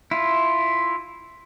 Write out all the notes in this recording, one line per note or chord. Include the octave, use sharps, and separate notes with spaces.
E4 F4